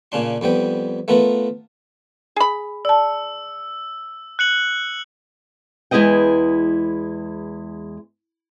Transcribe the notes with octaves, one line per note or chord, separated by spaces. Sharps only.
A#2 C#3 C#4 D4 C6
F2 G3 B3 G5
A3 B3 F4 A#4 B4
G#4 B5
D5 A5 E6
F#6 C#7 F#7
E2 G#3 E4 B4 D#5 G5